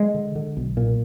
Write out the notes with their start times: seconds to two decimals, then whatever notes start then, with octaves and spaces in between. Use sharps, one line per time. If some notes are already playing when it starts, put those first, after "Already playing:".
Already playing: G#3
0.14 D3
0.35 D3
0.57 B1
0.77 A#2